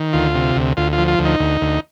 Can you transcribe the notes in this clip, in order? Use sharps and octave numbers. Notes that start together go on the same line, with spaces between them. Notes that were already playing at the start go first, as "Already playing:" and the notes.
Already playing: D#3
D2 F4
C3
D2
D2 F4
F4
F3
F4
D2
D#4
D2
D2